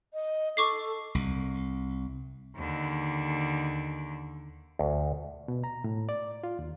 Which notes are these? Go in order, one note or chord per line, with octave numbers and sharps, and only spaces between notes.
D#5
A4 C#6 D6 C7
C2
D#2 D3
D2
B2
A#5
A2
D5
F4
D#2